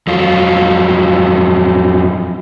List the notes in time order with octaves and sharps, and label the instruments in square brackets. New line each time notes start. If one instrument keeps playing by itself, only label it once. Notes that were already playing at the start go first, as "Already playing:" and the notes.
[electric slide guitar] F2 F#3 F4